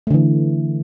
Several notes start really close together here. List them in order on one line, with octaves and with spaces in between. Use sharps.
A3 D3 E3